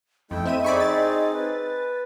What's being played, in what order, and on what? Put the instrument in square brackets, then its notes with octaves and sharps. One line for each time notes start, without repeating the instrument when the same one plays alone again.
[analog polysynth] F2 [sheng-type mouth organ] A3 E4 G5 [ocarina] D#5
[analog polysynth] C4 E5 D#7
[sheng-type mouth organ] C4 D#4 G#4 [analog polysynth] D5 B5 C#6
[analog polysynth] A6
[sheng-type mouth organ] B4